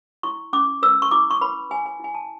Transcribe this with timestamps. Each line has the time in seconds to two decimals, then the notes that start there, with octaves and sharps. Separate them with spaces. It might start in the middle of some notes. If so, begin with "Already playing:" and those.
0.23 E4 C#6
0.53 C#4 D6
0.83 B4 E6
1.02 C#6
1.11 E4 D6
1.31 C#6
1.41 B4 B5
1.70 B4 G#5
1.86 G#5
2.00 E4 G#5
2.15 A5